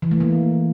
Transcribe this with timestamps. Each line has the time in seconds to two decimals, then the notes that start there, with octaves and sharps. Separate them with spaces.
0.02 E3
0.11 A3
0.20 A#3